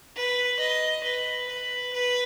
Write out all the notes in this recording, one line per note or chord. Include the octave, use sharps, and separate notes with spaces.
B4
D#5
B4
B4
B4